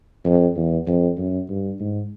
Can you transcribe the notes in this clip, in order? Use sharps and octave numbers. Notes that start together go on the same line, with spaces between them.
F2
E2
F2
F#2
G2
G#2